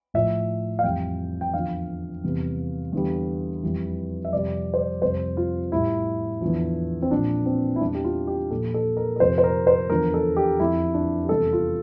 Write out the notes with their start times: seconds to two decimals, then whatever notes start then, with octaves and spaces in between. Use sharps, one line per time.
0.14 A2 F3 E5
0.79 F5
0.84 F2 E3 G3 G5
1.41 G5
1.54 E2 D3 F3 F5
2.24 E2 C3 G3
2.92 E2 D3 G3
3.63 F2 E3 G3
4.25 E5
4.32 F2 C3 G3 D5
4.74 C5
4.79 D5
5.02 F2 C3 G3 C5
5.37 F4
5.72 A2 G3 E4
6.41 E2 D3 F3
7.02 C4
7.11 A#2 F3 D4
7.46 C4
7.76 E4
7.80 E2 E3 G3 D4
7.95 G4
8.04 F4
8.27 G4
8.51 A#2 F3 A4
8.74 A4
8.97 A#4
9.16 A#4
9.20 F2 C3 F3 C5
9.38 C5
9.44 A#4
9.67 C5
9.90 E2 D3 F3 A#4
10.14 A4
10.36 G4
10.60 F2 D3 F3 E4
10.94 D4
11.25 G4
11.29 E2 C3 G3 A4
11.53 F4